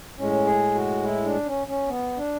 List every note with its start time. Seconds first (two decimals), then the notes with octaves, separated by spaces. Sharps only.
0.18 A2 G#3 C#4
0.46 G#4
0.75 F#4
1.03 E4
1.25 D4
1.46 C#4
1.67 C#4
1.88 B3
2.17 D4